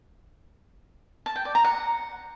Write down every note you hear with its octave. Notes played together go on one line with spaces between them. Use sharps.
A5
G5
D5
A#5
F#5